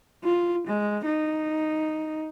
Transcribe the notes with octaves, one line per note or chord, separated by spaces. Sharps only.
F4
G#3
D#4